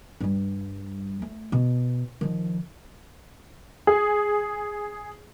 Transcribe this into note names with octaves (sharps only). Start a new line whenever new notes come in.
G2 G3
A3
B2
D#3 F3
G#4